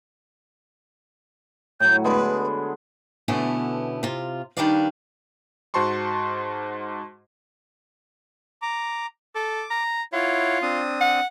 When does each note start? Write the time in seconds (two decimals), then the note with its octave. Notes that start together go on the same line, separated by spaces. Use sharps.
1.80 A2 F#3 G6
2.04 D3 G#3 B3 B4
3.28 B2 D3 A3 B3 C#4 E4
4.03 C3 F4
4.57 D#3 G3 D4 B4 D5 F5
5.74 G#2 F#4 C5 A5 C6 C#6
8.62 A#5 D6
9.35 A4 D6
9.70 A#5
10.13 E4 F4 C#5 F#5
10.62 C4 D4 D#6
11.01 F#5